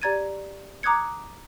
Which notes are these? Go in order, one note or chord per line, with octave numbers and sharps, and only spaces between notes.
G4 D5 A#5 G#6 A6 D#7
A#5 D6 D#6 F#6 G#6 C#7